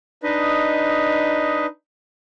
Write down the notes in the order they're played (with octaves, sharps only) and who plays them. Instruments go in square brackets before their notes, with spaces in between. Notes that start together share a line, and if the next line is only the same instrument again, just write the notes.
[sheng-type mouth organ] D4 D#4 B4 D#5